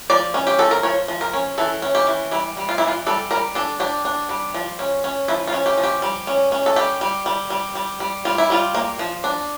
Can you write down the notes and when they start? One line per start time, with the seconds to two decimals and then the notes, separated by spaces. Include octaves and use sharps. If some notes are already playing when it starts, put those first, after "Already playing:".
0.10 F3 D5
0.34 C#4
0.47 G4
0.59 F3 A4
0.71 A#4
0.83 F3 C#5
1.08 F3
1.21 A#4
1.33 C#4
1.58 E3 A4
1.82 C#4
1.95 G4
2.07 E3
2.31 G3 E4
2.57 G3
2.69 F4
2.78 E4
2.82 E3
2.87 F4
3.06 G3 A4
3.31 G3 A#4
3.55 D4 A4
3.80 D4 G4
4.05 D4
4.29 G3
4.54 F3
4.79 C#4
5.04 C#4
5.28 F3 E4
5.47 F4
5.53 C#4
5.66 G4
5.78 F3
5.83 G4
6.02 G3
6.27 C#4
6.52 C#4
6.66 A4
6.76 G3 G4
7.01 G3
7.26 G3
7.50 G3
7.75 G3
8.00 G3
8.25 G3 F4
8.38 E4
8.50 G3 F4
8.75 A#3
8.99 F3
9.24 D4